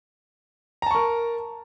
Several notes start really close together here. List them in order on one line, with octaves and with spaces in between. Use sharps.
A#5 A5 C#6 A#4